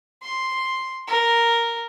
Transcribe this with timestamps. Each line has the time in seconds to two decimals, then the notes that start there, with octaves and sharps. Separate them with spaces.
0.22 C6
1.07 A#4